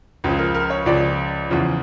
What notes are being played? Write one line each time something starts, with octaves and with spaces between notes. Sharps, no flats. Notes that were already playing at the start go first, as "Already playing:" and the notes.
C#2 C#3 F3
A#4
A#4
C#5
C#2 C#3 F3 D5
E2 C#3 F3